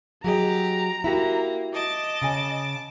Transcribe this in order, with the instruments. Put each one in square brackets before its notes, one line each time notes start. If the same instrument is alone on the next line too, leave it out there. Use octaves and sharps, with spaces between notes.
[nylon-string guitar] F#3 G#4 D#5 [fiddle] G4 [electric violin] A#5
[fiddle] A#3 [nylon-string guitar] E4 F#4 G4
[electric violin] D#5 [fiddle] A5 D6
[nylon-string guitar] C#3 G#5